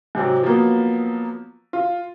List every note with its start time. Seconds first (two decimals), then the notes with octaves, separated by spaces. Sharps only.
0.15 G#2 C3 F#3 C4
0.43 F3 F#3 A#3 B3
1.73 F4